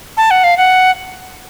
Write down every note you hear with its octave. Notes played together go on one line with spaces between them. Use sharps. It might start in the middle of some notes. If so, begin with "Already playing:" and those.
A5
F#5
F5
F#5